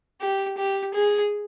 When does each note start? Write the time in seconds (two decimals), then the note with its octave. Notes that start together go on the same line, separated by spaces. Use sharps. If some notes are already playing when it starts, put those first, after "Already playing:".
0.21 G4
0.57 G4
0.94 G#4